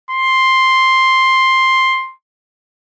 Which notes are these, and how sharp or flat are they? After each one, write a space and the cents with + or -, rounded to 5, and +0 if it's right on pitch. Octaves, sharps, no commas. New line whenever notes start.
C6 +5